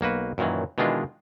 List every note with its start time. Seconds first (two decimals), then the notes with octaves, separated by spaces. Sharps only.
0.01 B1 A#3 F#4 B4
0.38 F#2 A#2 D#3 E3 F#3
0.78 B2 D#3 E3 G#3 D4 F4